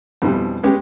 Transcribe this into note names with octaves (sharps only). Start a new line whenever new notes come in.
F2 B2 D3 E3 G3
G#3 B3 C#4 G4